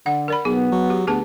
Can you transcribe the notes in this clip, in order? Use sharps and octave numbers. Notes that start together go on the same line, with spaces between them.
D3 F#5
A#4 D5 B5
B1 B3 G#4
F#3
G4
D2 B3 G#4 B4 A5